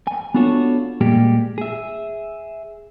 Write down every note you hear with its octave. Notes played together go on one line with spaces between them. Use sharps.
G#5
B3 D4 F4 F#4 A4 C#5
A#2 G3 G#3 A#3 G4
G#4 E5